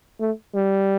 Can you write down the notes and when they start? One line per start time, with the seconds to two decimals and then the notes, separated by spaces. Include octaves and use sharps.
0.20 A3
0.55 G3